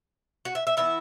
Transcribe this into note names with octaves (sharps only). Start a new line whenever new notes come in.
F#4
E5
E5
E3 B3 E4 E5